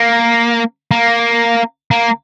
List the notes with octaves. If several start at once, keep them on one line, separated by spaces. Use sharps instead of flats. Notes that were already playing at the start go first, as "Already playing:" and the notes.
Already playing: A#3
A#3
A#3